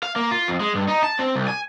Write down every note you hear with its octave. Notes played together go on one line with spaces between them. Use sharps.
F5
A#3
F4
F2
G#3
G2
D#4
A5
C4
C2
G#5